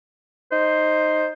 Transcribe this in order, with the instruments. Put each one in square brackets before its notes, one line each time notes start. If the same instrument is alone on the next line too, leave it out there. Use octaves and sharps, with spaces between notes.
[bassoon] D#4 [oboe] C5